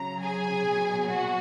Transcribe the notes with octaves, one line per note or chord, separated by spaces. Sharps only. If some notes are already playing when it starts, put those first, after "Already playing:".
Already playing: C#3 F#3 A#5
G#4 G#5
B2 F#3
F#4